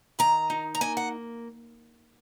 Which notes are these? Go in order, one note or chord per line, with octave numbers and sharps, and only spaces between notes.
D#3 A#5
D#4
A#5
A#3 G#5
F#5